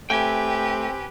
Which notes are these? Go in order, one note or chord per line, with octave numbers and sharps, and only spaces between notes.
A3 C4 G4 B4 G5 G#5